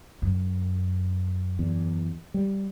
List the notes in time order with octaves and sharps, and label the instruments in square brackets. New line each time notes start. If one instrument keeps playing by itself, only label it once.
[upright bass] F#2
[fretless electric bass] E2
G3